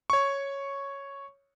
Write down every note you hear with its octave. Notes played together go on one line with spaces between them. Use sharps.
C#5 C#6